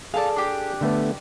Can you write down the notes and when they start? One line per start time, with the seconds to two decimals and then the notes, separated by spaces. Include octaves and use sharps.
0.14 G#4 A4 D5 F5 A5
0.36 D4 G4
0.81 D3 A3 B3